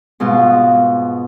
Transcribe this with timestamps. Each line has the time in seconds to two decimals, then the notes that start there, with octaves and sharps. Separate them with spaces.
0.20 G#2 B2 F4